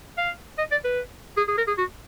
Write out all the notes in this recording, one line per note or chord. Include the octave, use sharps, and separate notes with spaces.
F5
D#5
D5
B4
G#4
G#4
A#4
G#4
F#4